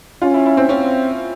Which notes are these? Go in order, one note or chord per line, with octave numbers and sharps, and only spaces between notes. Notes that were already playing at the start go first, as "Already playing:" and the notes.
C#4 F4
E4
E4
C4
C4 C#4